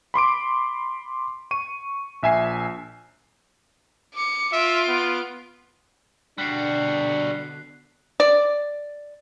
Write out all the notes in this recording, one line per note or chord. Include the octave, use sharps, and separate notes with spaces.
B5 C6 D6 D7
C#6 D#7
A#1 E5 G#5 C7
D6 C#7
F4 E5 D7
B3
B2 D3 G3 D4 F#4 F#6 B6 C7
D5